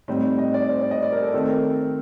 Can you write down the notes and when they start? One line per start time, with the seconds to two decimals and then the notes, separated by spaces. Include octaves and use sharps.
0.08 A2 G3 C4 D#4
0.39 D#5
0.54 D5
0.70 C5
0.81 D5
0.91 D#5
1.02 D5
1.12 A#4
1.22 A4
1.33 D#3 A3 C4 D#4 A4
1.48 A#4